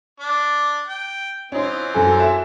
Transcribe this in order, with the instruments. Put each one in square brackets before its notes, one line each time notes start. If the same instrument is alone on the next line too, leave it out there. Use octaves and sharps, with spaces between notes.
[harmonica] D4 D6
G5
[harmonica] E3 C4 F4 [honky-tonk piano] C#4 D#4
[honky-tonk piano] F#2 A4 [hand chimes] F#4 G#5
[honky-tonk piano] E5